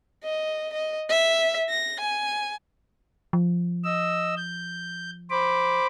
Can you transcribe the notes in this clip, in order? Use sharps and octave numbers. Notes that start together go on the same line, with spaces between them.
D#5
D#5
E5
A#6
G#5
F3
D#5 E6
G6
C5 B5 D6